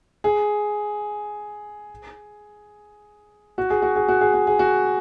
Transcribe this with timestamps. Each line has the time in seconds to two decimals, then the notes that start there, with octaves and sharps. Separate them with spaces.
0.24 G#4
3.58 F#4
3.70 G#4
3.82 F#4
3.96 G#4
4.08 F#4
4.21 G#4
4.33 F#4
4.47 G#4
4.59 F#4